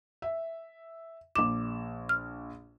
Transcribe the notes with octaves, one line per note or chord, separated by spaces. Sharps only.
E5
A#1 D6 E7
F6